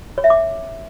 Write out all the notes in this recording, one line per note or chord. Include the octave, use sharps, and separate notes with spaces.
C#5
E5
D6